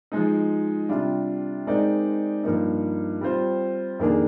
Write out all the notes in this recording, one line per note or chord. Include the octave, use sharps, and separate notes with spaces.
F3 G#3 D#4
C3 G3 D4 F4
G#3 C4 D#4 A#4 D5
G2 F3 A#3 D#4
G3 C4 F4 C5
F2 D#3 A#3 D4 G#4